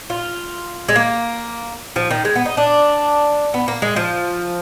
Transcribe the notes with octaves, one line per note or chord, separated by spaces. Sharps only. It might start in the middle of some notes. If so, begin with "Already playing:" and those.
F4
G#3
A#3
F3
D#3
G#3
B3
D#4
D4
B3
A#3
G#3
F3